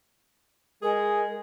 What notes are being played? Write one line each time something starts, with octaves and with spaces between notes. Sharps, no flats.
G#3 G#4 A#4